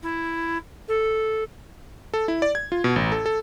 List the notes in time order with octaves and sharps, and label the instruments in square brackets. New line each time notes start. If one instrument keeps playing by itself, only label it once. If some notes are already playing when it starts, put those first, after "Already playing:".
[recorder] E4
A4
[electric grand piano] A4
E4
D5
G#6
F4
B2
A1
A4
A4